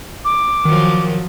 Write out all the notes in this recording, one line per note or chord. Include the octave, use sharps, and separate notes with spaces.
D6
D#3 F3 F#3